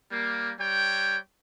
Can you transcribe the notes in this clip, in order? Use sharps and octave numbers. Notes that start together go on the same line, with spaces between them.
G3 A#3
G3 C#5 G5